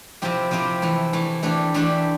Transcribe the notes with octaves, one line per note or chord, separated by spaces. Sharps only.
C3 F3 C4 E4 G4
C3 F3 C4 E4 G4
E3 A3 E4
E3 A3 E4
E3 A3 D4 G4
E3 A3 D4 G4